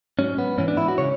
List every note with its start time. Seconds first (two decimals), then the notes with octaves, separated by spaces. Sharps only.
0.19 G#2 F#3 C#4
0.38 B3
0.58 G#2 E3 C#4
0.68 D4
0.77 E4
0.88 F#4
0.98 C#3 C#5